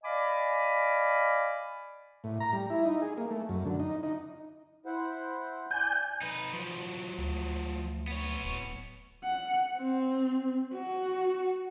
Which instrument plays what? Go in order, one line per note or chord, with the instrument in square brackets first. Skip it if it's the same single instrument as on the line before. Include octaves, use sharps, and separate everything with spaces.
[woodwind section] D5 D#5 F5 G#5 B5 D6
[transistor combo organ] A2
A#5
G3
E4
D#4
G#4
A#3
A3
F#2
D3
D#4
D#4
[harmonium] E4 C5 F#5
[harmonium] D5 [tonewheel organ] G#5 G6
[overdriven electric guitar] D#4 B4
F3 F#3
[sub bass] D2
[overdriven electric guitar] B3 C#5
[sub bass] D1
[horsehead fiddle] F#5
C4
F#4